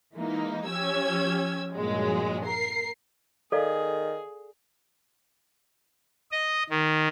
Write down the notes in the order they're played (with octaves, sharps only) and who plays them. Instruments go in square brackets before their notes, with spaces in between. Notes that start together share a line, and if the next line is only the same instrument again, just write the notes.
[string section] E3 G#3 A#3 D#4
F3 C#4 G4 E6 G#6
G2 A#2 F3 F#3 G#3
A#4 C7
[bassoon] D#3 [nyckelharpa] G#4 [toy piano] A4 D5 F5
[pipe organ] D#5
D#3